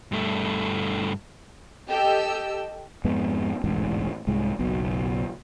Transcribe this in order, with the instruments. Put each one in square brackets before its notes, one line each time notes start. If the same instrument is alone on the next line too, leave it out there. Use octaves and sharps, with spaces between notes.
[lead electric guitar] G2 A3
[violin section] G4 A4 D#5 G5 E6
[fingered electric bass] F2 G#2 G#3 B3
E1 A1 G#2
C2 G#2 G#3
F#1 B1 B2